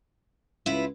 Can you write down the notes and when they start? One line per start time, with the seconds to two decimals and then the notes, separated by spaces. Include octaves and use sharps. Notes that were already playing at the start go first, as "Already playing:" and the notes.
0.66 C#2 E4 F4 B4